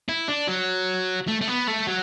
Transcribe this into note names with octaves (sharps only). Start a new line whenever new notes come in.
E4
D4
F#3
A3
A3
B3
A3
F#3